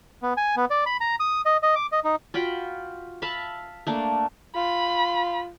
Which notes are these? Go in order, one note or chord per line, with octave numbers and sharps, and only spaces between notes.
B3
G#5
B3
D5
B5
A#5
D#6
D#5
D#5
D6
D#5
D#4
F4 F#4 G5 B5
E5 F5 A5 B5
A3 A#3 D4
F4 B5